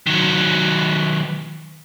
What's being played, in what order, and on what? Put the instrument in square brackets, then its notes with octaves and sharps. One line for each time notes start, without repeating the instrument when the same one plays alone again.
[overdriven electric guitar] D#3 F#3